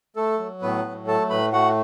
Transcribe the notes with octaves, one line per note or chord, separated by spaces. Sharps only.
A3 A4
F#3
A2 B3 B4
F#3
A3 A4 A5
A2 B4 B5
A3 F#4 F#5